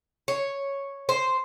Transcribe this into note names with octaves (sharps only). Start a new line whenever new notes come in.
C#5
C5